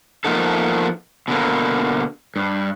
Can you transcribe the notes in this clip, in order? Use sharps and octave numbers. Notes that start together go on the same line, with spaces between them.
F3 A#3 B3 D#4 A4
B2 D3 A#3
G2